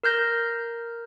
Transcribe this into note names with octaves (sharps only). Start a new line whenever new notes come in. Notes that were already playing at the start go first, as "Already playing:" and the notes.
A#4 F6 G6 A#6